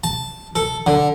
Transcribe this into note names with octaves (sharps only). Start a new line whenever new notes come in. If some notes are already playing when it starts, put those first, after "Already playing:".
A5
A4
D3